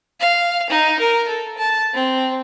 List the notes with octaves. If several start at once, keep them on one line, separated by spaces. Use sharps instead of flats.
F5
D#4
A#4
A4
A5
C4